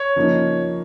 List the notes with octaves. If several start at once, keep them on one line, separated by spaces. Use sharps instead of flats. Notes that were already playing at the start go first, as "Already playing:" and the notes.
Already playing: C#5
C#3 F3 A#3 D#4